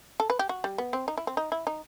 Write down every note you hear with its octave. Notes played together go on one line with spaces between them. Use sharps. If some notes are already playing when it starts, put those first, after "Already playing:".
A4
B4
G4
F#4
G3
B3
C4
D#4
E4
C4
D#4
E4
D#4